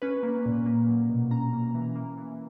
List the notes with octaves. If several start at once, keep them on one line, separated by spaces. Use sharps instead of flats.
C#4 B4
A#3
A#2
A#3
F#3
B2
C#4 A#5
A#3
E3
A#3
E3